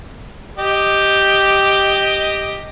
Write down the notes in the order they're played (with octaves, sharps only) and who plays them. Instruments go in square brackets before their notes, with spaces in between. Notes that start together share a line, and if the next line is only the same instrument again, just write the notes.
[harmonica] G4 D#5